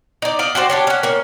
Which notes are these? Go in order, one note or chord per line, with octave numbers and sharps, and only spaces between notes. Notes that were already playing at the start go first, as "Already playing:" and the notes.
D#4 D5
D5 D#5 F5
F#4 G4 C5 D5
C#4 D4 G4
C#4 F#5
A#3 C#4